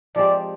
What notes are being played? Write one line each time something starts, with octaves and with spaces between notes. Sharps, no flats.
F3 G#3 C4 G4 D5